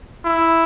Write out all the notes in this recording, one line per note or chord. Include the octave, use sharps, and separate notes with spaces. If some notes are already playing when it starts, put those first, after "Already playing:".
E4